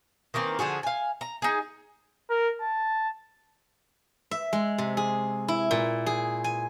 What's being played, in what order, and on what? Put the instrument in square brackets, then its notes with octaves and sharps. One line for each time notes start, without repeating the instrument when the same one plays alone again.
[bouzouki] D#3 E3 A#3 C4
D3 F3 F#4 G#4
F5 G#5
A#5
D#4 G#4
[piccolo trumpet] A#4
A5
[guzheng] E5
G#3
C3
G#4
E4
A#2
G#4
G#5